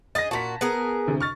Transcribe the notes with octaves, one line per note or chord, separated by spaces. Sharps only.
G#4 D#5 A6 A#6
A#2 F#4 A5 B6
B3 G#4 A#4
D2 C3
C#6 F6 A6